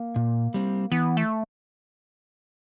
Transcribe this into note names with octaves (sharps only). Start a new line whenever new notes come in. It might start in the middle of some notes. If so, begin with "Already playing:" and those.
Already playing: A#3
A#2
G3 C4
E3 B3
A3